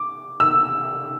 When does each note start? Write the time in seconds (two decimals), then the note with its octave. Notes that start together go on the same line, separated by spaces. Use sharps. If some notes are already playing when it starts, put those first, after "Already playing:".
Already playing: D6
0.40 E6